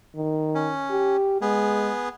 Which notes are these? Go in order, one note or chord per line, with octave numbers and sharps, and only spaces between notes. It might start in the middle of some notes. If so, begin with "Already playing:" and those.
D#3
C#4
G4
G#3 B3 G#4